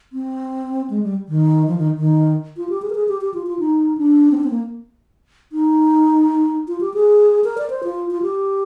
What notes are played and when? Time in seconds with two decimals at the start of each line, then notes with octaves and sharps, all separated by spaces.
0.13 C4
0.90 G#3
1.03 G3
1.28 D#3
1.67 F3
1.78 D#3
1.98 D#3
2.57 F4
2.69 G4
2.82 G#4
2.90 A#4
2.95 G#4
3.08 G4
3.21 G4
3.34 F4
3.47 F4
3.59 D#4
3.98 D4
4.31 C4
4.37 D4
4.44 C4
4.50 A#3
5.52 D#4
6.68 F4
6.81 G4
6.94 G#4
7.44 A#4
7.58 D5
7.70 C5
7.84 F4
8.11 F4
8.22 G4